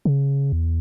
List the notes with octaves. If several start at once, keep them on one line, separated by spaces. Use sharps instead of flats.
C#3
E2